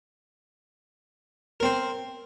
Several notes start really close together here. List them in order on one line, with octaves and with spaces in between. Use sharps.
A#4 C4 C5